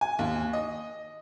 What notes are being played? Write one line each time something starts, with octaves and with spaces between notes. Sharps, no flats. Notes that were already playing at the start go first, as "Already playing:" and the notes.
G#5
D#2
D#5